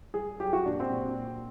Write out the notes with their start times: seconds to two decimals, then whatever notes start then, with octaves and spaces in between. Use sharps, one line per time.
0.14 G3 G#4
0.40 F#3 G4
0.53 F#4
0.66 A#2 D4
0.80 C4
0.92 A#2
1.18 A#2